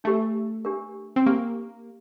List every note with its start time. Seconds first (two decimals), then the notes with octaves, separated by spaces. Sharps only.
0.04 A3 D4 G4 A#4
0.65 D4 G4 A#4
1.16 C4
1.26 A#3 D4 G4 A#4